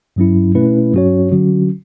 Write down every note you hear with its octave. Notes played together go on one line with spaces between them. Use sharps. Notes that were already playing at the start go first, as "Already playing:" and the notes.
G2 F#3 C#4 E4
B2 A3 C#4 E4 B4
G2 F#3 C#4 F#4 C#5
D3 F#3 C#4 F#4